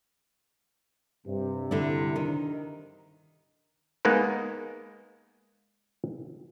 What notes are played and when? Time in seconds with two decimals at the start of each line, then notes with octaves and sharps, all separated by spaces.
1.26 G2 C3
1.71 D3 E4 D5
2.16 D#3
4.05 G#3 A#3 B3 D#4 A#4